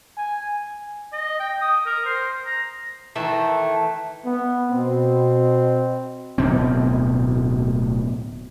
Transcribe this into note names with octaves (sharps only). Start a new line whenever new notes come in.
G#5
D#5
G5
D#6
A#4
C5
A#5
D#3 E3 A3 A4
B3
B2 C4
D1 D2 B2 C4